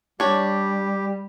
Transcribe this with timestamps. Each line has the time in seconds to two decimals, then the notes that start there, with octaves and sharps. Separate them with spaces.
0.20 G3 D4 G4 C#5